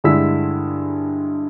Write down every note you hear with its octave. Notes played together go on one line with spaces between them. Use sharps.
G2 D3 G#3 E4 E6 B6